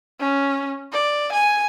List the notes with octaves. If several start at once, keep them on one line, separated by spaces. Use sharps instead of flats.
C#4
D5
G#5